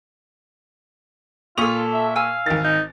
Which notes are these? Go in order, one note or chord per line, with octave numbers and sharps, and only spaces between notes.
A#2 F4 A4 C#6 D#6 F7
E5
F5 G#5 E6
G#1 D#3 A6
D#4